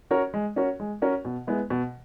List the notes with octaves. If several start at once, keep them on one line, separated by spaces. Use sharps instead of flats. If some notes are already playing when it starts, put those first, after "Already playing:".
C#4 F#4 A#4 C#5
G#3
C#4 F#4 A#4 C#5
G#3
C#4 F#4 A#4 C#5
B2
G#3 B3 E4
B2